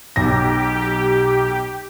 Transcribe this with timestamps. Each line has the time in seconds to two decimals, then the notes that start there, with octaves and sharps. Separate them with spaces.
0.16 B1 G4 A#6